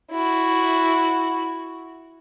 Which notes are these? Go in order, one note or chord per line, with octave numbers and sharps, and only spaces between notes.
E4 F#4